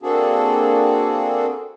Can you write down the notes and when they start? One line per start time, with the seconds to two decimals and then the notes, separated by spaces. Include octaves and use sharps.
0.03 A#3 C4 D4 F#4 G#4 A4